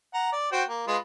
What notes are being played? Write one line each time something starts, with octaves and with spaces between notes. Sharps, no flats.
F#5 A#5
D5
F#4 C5 G5
A#3
G#3 F4 B4